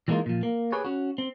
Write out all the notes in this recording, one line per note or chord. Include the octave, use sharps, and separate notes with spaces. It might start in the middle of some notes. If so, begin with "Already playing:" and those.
E3 G3 G#3 A#3 D#4 F4
A#2 F3
A#3
G4 G#4 B4 C#5
C#4 F#4
C4